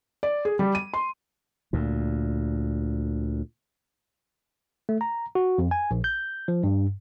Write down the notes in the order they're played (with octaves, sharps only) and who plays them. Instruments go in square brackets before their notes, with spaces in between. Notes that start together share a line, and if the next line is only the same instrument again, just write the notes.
[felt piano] D5
G#4
G3
D#7
C6
[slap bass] D2 A#2
[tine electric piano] A3
A#5
F#4
F2
G#5
A#1
G6
F3
G2